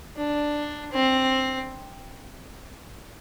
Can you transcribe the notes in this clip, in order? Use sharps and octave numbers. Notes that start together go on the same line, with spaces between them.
D4
C4